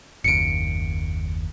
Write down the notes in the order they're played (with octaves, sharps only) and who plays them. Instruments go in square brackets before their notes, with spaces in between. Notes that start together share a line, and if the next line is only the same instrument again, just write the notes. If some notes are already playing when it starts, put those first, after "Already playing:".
[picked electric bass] F#1 D#2 [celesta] C#7 D7